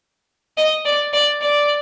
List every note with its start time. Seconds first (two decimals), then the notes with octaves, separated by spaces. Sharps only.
0.57 D#5
0.86 D5
1.13 D5
1.42 D5